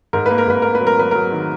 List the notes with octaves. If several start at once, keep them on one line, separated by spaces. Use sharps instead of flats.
G#2 A#4
A#3 B4
A#4
G#2 B4
A#3 A#4
B4
F#3
A#4
F#3 B4
F#3 A#4
D#3